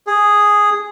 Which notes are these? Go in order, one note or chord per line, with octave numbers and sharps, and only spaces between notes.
G#4